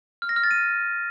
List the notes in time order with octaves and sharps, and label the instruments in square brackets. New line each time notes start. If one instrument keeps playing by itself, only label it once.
[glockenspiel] F6
A#6
F6
A6
D#7